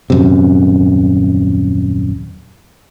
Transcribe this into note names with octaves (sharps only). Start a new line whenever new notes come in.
D#1 F#2 C3